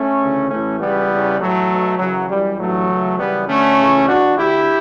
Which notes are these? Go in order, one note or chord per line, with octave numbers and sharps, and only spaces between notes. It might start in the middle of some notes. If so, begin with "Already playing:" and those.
Already playing: A3 C#4
D2 C#3 E3
A1 A2 E3 A3 C#4
C#2 C#3 E3 G3 B3
E2 C#3 E3
B1 A2 E3 F#3 A3
B1 B2
F#2 C#3 E3 F#3
F#2 E3 G3
A1 G2 E3 F#3 A3
C#2 C#3 E3
F#2 C#3 E3 G3 B3
D2 D3 A3 C#4
C#2 C#3 E3
E2 B2 D4 F#4
D2 D3 E4 G4